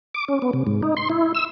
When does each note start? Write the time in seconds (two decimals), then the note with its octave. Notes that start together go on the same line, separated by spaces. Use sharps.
0.14 D6
0.28 C#4
0.42 B3
0.53 C3
0.67 G#2
0.83 D#4
0.97 C6
1.10 E4
1.35 E6